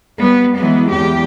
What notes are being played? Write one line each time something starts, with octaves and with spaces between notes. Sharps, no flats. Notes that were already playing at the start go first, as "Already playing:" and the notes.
G3 B3
E3 F#3 G#3 B3
E2 G4